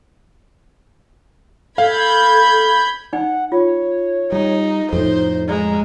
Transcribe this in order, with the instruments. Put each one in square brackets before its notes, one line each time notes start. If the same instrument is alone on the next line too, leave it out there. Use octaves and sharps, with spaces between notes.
[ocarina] A4 [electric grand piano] F5 [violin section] B5 G6 G#6
[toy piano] D#4 D5 G#5 [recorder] F#5
[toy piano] F4 [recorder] C#5
[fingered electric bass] G3 [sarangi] D#4
[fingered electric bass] F2 A2 [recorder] D#4 [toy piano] A4 [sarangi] C5
[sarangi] G#3 [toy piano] D5 [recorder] A#5